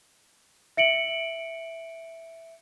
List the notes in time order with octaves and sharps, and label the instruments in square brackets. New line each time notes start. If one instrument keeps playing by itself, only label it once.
[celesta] E5 C#7 D7 F#7